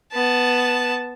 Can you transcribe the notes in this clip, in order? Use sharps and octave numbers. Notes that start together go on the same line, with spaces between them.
B3 A5